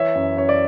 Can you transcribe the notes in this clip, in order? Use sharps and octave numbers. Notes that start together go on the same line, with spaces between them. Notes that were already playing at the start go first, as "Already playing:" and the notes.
Already playing: E3 C#5 E5
F#2
F#2 C#5
D5